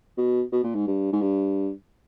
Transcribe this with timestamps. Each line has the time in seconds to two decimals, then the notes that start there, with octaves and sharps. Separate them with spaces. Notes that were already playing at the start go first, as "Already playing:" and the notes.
0.17 B2
0.52 B2
0.63 A#2
0.75 G#2
0.87 G2
1.12 G#2
1.21 G2